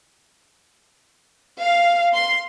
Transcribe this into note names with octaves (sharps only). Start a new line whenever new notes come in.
F5
C6